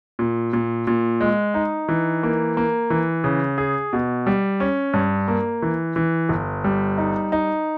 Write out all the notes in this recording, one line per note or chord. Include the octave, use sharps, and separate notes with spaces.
A#2
A#2
A#2
G#3
D#4
E3
A#3
A#3
E3
C#3
G#4
B2
G3
C#4
G2
A#3
E3
E3
G1
G3
D#4
D#4